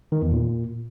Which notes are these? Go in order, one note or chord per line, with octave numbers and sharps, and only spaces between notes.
D#3
E2
A#2